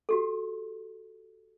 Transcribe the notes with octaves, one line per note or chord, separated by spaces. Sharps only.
F#4 G4 A4